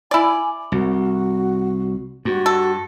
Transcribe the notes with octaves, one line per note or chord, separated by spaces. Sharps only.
E4 D5 G#5
C2 F#4
G2 F#4
A4